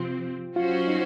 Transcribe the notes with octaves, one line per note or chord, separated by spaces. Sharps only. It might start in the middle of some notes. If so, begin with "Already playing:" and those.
Already playing: C3 F3 C4 F4
F#3 C#4 F4 F#4 C5
D#4